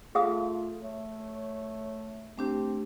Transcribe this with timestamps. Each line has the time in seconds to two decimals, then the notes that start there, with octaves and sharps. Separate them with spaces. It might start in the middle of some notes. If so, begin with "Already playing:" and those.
0.15 A3 F4 G#4 F5 D#6
0.83 A3 C#5
2.38 A3 C4 D4 G4